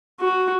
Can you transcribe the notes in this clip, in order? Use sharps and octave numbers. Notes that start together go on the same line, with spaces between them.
F#4